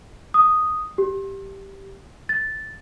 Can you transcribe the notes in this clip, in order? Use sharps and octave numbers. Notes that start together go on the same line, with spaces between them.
D#6
G4
A6